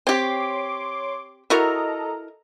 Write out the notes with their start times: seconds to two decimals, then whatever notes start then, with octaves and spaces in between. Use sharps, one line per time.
0.07 C4 G4 C#5 C6 D6
1.50 E4 F#4 A4 A#4 D#5 A#5